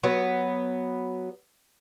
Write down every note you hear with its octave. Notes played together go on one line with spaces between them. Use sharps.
F#3 B3